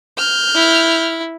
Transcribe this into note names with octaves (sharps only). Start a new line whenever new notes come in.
F6 G6
E4